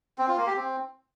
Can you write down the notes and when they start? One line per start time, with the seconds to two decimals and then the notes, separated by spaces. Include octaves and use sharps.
0.18 C4
0.28 F4
0.37 A#3
0.47 G4
0.56 C4